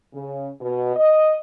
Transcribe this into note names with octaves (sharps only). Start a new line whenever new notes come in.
C#3
B2
D#5